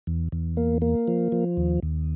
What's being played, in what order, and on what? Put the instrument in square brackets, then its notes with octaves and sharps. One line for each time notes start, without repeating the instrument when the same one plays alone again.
[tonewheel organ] E2
E2
A#3
A#3
F3
F3
D#2
D#2